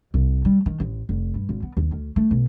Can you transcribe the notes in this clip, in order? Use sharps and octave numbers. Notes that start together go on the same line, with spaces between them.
C2
G3
D#3
A1
F1
G2
G#1
B3
D#2
D2
A3
B1